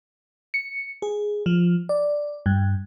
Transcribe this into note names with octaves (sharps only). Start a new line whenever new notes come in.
C#7
G#4
F3
D5
G2